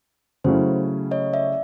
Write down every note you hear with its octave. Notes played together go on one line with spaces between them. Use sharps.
C#3 F#3 A3 C#4 E4 C5
C#5 D#5
D5 E5